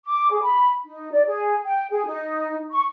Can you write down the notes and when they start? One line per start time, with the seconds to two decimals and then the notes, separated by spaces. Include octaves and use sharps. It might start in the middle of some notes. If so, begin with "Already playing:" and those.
0.06 D6
0.31 G#4
0.42 B5
0.85 D#4
1.11 D5
1.27 G#4
1.66 G5
1.91 G#4
2.07 D#4
2.71 C#6